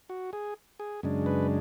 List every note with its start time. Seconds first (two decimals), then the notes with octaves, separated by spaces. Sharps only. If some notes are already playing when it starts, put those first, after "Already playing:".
0.09 F#4
0.33 G#4
0.80 G#4
1.03 F#2 C#3 G#3 D4
1.26 B4